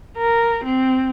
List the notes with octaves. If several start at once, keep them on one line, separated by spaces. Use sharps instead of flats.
A#4
C4